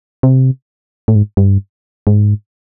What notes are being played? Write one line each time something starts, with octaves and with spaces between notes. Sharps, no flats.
C3
A2
G#2
G2
G#2